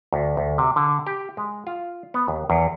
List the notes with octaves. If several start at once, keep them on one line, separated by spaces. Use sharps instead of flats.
D2
D2
C3
D3
G4
G#3
F4
B3
D#2
E2